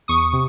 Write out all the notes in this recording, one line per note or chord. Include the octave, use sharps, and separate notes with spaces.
E2 C#6 D#6
C3